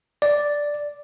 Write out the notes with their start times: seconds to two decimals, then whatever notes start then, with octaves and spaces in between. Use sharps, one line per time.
0.22 D5